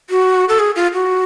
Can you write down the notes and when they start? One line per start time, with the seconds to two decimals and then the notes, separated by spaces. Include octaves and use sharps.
0.10 F#4
0.49 A4
0.59 G#4
0.76 F4
0.93 F#4